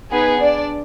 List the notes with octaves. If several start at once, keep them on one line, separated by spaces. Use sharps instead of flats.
B3 D#4 G#4 B4
D4 D5